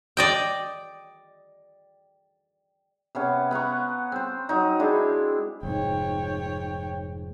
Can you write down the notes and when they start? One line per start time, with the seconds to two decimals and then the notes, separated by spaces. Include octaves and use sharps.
0.17 D5 D#5 G5
3.15 C3 B3 C#4
3.51 B3 F#5 A#5 C#6
4.12 C4 C5
4.49 F#3 D#4
4.79 G#3 D4 E4
5.63 F1 G#2 C#5 G5